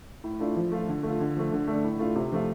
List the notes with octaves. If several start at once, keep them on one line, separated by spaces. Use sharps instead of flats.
A2
A3 D4 F4
F3
A3 F4
D3
A3 F4
D3
F3 A3
D3
A3 D4
A2
A3 D4 F4
C3
F3 A3 F4